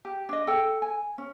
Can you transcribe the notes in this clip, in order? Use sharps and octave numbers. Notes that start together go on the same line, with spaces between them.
G4
D4 D#5
A4 G5
G#5
C#4